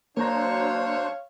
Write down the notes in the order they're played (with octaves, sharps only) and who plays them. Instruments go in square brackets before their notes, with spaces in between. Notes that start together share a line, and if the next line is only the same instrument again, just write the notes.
[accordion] F#3 D4 C5 [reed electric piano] A#3 A#5 [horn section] C#5 F5